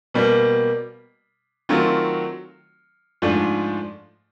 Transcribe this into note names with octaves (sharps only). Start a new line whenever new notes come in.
B2 G3 A#3
D#3 F#3 A3 C4 F4
G#2 F3 A3 D4